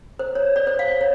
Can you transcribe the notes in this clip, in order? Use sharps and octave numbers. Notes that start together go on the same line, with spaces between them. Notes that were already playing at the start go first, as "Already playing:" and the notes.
C5
C#5
D5
C5
F5
C#5